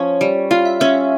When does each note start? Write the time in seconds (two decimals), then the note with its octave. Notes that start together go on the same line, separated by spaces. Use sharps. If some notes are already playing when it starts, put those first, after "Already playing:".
Already playing: F3 C#4 C#5
0.21 G3
0.51 F4 F5
0.65 E5
0.80 C#4 E5